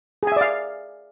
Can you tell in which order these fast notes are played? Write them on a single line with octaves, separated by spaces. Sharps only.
G#4 G#5 E5 D5 F5